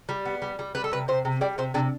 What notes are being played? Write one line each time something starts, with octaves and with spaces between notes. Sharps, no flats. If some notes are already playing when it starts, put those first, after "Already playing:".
G3
B3
G3
G3
G3 B4
A4
C3 B4
C3 C5
C3
G3 D5
C3 C5
C3 D4